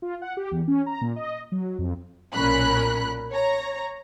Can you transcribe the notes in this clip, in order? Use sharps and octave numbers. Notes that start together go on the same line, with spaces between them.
F4
F#5
G4
E2
C#4
A#5
A#2
D#5
F#3
F2
B1 A#2 C#4 A#4 B5 F#6
C#5 A#5